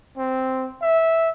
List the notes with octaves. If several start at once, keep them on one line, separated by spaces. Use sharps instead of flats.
C4
E5